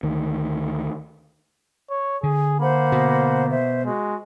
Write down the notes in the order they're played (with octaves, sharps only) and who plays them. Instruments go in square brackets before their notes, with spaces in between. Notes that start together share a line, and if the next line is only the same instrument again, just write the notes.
[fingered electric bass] D2 D#3
[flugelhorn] C#5
[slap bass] D3 [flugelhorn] G#4
[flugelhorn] A#3 [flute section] C5 F#5 B5
[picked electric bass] B2
[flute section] C5 E5
[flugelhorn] G#3 [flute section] F#4